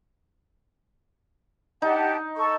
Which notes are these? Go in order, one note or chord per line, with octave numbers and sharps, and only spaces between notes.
D#4 G4 F#5 A5
A4 C#6